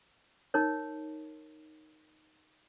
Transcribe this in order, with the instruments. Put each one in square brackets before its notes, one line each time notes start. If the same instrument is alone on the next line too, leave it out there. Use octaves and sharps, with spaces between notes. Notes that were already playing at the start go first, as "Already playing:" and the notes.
[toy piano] D#4 A#4 C#5